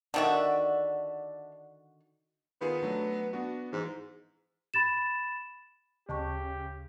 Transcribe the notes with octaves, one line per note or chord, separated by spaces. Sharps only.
D3 D#3 D4 F#4 E5
D#3 B3 F4 G#4
F#3 A3 D4
B3 D4 F#4
G#2 E3
B5 A6 E7
D2 C#3 G4 A5 C#6